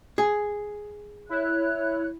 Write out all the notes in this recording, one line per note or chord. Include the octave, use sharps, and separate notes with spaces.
G#4
E4 C#5 F#6